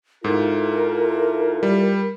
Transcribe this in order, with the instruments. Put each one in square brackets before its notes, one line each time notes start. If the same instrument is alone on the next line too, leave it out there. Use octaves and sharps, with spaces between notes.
[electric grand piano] G#2 [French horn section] E4 F4 A4 [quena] A#4
[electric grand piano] G3